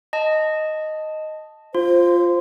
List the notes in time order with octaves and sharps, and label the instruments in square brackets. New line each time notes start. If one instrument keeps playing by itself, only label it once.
[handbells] D#5 A5
[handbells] F4 [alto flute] C5